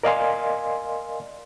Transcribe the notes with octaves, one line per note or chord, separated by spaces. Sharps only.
A#4 D5 D#5 F5 G#5 C6